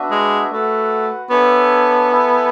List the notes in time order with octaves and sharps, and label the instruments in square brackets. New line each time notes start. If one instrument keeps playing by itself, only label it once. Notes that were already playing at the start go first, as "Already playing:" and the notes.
Already playing: [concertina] B3 D4 F#4 B4 E5
[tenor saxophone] G#3
[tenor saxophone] A3 [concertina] F#4 B4 F#5
[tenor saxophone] B3 [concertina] D4 A4 C#5 E5 G#5
[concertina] E4 A4 E5 G#5